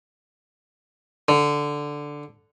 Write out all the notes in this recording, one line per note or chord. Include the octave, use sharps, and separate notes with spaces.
D3